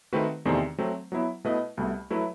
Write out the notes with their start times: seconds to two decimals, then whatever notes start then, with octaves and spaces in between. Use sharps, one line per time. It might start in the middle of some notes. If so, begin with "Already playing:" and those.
0.13 D#3 A3 C4 F#4 B4
0.45 E2 C3 D#3 A3 C4
0.78 F#3 A3 C4
1.12 F#3 B3 E4
1.44 B2 A3 E4 B4 D#5
1.77 C2 B2 A3
2.10 F#3 A3 E4 B4